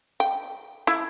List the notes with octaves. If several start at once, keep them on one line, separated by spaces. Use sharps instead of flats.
G5
E4